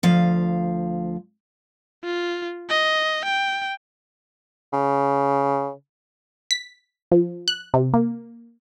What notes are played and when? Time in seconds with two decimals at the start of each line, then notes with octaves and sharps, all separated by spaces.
0.03 D2 F3 F5
2.04 F4
2.70 D#5
3.25 G5
4.73 C#3
6.51 B6
7.12 F3
7.48 F#6
7.74 C3
7.94 A#3